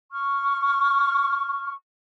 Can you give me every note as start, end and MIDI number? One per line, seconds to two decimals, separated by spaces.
0.11 1.73 85
0.11 1.73 89